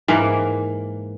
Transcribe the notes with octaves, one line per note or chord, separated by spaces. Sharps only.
G#2 E3 A#3